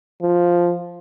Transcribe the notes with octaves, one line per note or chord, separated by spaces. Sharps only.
F3